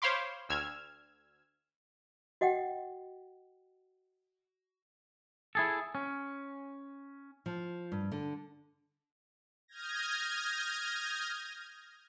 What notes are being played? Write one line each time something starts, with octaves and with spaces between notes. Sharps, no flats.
C5 C#5 F5 B5 C6 D6
D2 E6 F6 G#6
F#4 D#5 F#5 G5
E4 G#4 A4
C#4
F3
G2
D3
D#6 F6 G6 G#6 A#6